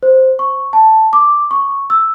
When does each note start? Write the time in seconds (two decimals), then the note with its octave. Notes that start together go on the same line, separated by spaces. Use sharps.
0.03 C5
0.39 C#6
0.73 A5
1.13 D6
1.51 C#6
1.90 E6